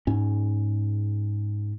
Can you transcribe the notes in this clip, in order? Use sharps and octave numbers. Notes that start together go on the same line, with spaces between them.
G#2 C#4